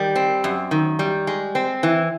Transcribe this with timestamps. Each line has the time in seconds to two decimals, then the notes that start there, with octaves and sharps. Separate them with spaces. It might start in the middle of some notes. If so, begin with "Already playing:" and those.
Already playing: D#3 G3
0.16 C4
0.44 F#2
0.71 D#3
0.99 G3
1.27 G#3
1.55 C4
1.83 E3